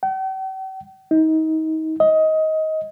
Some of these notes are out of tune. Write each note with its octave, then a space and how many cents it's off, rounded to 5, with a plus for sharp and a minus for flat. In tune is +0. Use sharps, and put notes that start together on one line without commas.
G5 -45
D#4 +30
D#5 +20